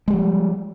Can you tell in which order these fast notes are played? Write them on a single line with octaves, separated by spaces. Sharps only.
G#3 G3 F3